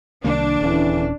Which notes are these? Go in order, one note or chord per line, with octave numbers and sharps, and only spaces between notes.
C2 D#3 A#3 D4
D#1 E2 D3 E3 C#4